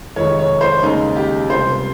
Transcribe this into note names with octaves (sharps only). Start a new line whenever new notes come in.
F1 F2 D#3 G#3 C#5
C#5
C5
D#2 C#3 G#3 D#4
G4
C#2 C3 G3 C5